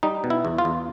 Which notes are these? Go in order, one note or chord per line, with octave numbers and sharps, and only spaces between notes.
G3 D#4
B2
E4
E2
F4
E2